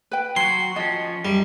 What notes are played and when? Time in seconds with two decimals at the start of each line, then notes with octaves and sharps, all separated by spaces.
0.11 B4 G5
0.36 F#3 F#4 C6
0.76 F3 C#4 D#5
1.25 F#2 G3